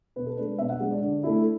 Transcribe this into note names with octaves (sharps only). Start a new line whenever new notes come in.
B2 B4
A4
G#3 D4 B4
B2 E5
F#5
G#3 D4
D5
D3
A3 E4